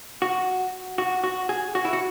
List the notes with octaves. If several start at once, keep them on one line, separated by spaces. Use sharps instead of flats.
F#4
F#4
F#4
G#4
F#4
E4
F#4